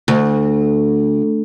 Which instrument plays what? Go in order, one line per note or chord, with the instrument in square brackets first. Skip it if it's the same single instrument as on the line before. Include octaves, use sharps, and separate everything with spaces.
[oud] D2